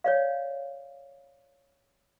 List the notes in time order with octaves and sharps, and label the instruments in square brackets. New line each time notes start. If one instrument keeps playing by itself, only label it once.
[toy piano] C#5 D5 F5